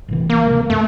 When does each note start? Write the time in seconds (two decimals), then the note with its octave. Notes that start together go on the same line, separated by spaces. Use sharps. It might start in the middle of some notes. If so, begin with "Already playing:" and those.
0.08 A1 C3 E3
0.30 A#3
0.47 D1 C3 G#3
0.70 F#2 A3